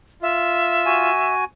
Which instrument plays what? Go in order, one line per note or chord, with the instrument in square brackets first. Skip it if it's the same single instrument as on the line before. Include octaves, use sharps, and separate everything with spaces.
[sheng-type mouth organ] F4 [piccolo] E5
[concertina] F#4 G#5